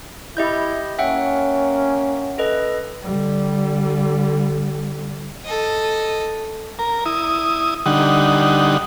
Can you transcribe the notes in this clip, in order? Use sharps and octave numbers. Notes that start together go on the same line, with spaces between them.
E4 G4 D#5 G6
A#3 C#4 E5 F#5 G5
A4 B4 D#5
D3 G3
A4 D#5
A#4
E4 D#6
D3 G3 D#4 F#5